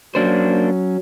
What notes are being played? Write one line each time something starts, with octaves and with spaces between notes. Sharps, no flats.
F#3 A#3 C#4 D4 C5